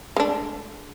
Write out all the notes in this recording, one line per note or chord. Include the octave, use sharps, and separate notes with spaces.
G#3 A3 D4